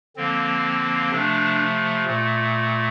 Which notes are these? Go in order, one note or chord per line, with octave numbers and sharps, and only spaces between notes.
D3 F3 A#3 C4
C3 F3 A3 D4
A#2 A3